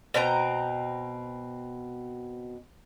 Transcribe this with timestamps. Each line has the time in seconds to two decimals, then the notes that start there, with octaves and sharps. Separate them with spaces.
0.14 B2 C4 G5 A#5